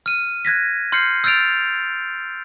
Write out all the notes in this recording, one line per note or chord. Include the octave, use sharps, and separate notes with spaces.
F6 D#7
F#6 G#6 A#6 B6
C6 F6 G6 C7 C#7
E6 F6 G6 A6 D7 F7